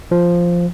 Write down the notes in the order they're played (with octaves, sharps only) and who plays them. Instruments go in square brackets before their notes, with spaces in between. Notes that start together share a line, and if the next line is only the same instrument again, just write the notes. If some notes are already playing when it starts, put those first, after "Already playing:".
[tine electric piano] F3